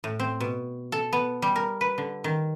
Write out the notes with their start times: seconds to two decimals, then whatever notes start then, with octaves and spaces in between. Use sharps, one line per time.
0.04 A2
0.19 C4
0.40 B2
0.92 A4
1.13 B3
1.42 G3
1.56 A#4
1.81 B4
1.98 D3
2.24 D#3